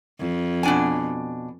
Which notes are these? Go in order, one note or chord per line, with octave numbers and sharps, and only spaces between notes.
F2
B2 D4 G#5